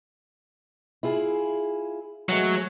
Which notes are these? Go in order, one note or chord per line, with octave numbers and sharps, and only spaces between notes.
E4 F4 G#4
E3 F#3 G#3 A3